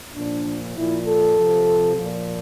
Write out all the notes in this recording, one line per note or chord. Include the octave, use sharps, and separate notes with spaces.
A#2 F3 D4
A#2 F3 E4
A4
C3 F3
A#2 F3